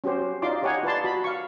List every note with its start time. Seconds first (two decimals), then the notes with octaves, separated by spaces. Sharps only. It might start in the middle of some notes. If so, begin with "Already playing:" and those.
0.04 C#4 F#4 G4 C5
0.42 D#4 F4 D5 C6 D6
0.62 D#4 G4 C#5 F#5 G#5
0.83 F4 B4 D5 A5 C6
1.04 F#4 B5
1.24 F5 C#6